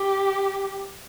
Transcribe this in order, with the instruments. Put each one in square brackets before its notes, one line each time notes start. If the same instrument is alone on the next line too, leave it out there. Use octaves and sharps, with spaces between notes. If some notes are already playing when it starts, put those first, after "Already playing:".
Already playing: [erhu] G4